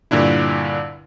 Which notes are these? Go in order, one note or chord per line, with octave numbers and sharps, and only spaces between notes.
G2 A#2 D3 D4 E4